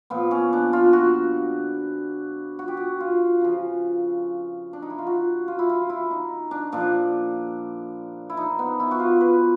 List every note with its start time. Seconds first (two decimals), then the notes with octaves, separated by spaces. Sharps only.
0.10 A#2 F3 B3
0.31 C#4
0.53 D4
0.73 F4
0.93 F#4
2.59 F#4
2.68 G4
2.77 F#4
3.00 F4
3.41 C#3 F3
4.73 D4
4.82 D#4
4.90 E4
4.99 F4
5.07 F#4
5.48 F4
5.59 E4
5.69 F4
5.90 E4
6.11 D#4
6.51 D4
6.72 A#2 F3 D4
8.30 E4
8.37 D#4
8.59 B3
8.80 E4
8.91 F#4
8.99 F4
9.21 B4